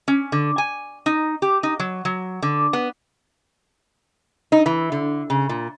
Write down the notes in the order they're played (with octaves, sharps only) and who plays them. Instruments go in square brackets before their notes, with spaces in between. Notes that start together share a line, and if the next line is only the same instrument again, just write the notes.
[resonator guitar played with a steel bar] C#4
D3
G#5
D#4
G4
D#4
F#3
F#3
D3
B3
D#4
E3
D3
C#3
A#2